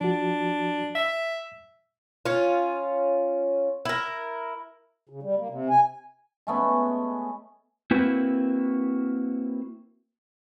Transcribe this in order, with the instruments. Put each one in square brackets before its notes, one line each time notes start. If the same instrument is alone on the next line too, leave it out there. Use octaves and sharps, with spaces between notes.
[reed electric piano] F3 F#4 [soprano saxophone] D4
[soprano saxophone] E5 [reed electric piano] E6
[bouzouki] C#4 F4
E4 A#4
[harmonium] C#3
G3
A#3
C3
G#5
[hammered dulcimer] G#3 A3 B3 C#4
[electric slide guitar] A#3 C4 E4 F#4 B4